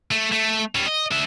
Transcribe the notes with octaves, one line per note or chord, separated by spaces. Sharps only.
A3
A3
G3 C#4
D#5
D4 E5